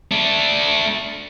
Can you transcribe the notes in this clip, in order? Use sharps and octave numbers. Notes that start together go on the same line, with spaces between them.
A3 D4